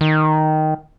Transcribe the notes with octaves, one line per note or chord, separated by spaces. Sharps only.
D#3